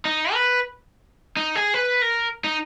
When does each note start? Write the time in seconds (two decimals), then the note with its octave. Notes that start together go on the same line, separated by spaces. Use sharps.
0.05 D#4
0.33 B4
1.37 D#4
1.55 G#4
1.74 B4
2.02 A#4
2.44 D#4